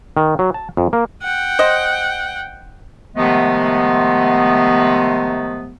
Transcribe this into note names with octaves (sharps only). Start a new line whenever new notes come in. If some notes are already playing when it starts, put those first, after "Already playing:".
D#3
F#3
A5
F2
A#3
F#5 G5
C5 D#5
C3 D#3 F3 G#3 A3 B3